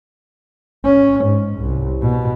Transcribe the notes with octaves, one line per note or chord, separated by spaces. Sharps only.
C#4
G#2
C2
B2